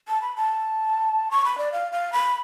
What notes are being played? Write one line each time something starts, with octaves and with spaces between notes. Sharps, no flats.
A5
B5
A5
C#6
B5
D5
F5
F5
B5